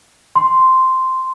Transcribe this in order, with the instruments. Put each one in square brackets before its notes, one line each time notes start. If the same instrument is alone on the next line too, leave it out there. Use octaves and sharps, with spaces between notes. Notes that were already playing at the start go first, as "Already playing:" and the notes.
[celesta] C6